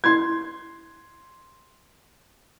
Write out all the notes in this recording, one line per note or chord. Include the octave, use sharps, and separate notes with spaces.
C6 G#6